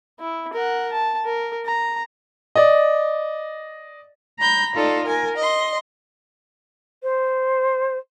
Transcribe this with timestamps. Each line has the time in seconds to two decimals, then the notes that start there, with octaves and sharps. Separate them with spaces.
0.20 E4
0.53 A#4 F#5
0.92 A5
1.25 A#4
1.65 A#5
2.56 D5 D#5
4.39 A#5 B5 G6
4.75 D#4 F4 A4 D5
5.06 A#4 G#5
5.37 D#5 C6
7.03 C5